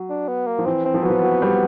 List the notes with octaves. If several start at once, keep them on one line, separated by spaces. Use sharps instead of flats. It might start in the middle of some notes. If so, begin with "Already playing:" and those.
Already playing: F#3
D4
B3
A#3
F3
E3 C4
C4
F3
F#3 B3
F3
F#3
G3